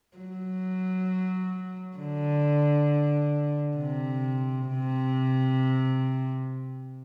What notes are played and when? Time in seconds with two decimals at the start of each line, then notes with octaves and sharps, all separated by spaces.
0.17 F#3
1.97 D3
3.77 C3
4.67 C3